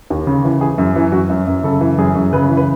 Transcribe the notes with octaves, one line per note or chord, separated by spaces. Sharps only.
D#2
C#3
E3
E3 G#4
F#2
E3
F#2 F#4
F#2
F#2
C#3 A4
E3
F#2 G#4
F#2
C#3 B4
E3
B4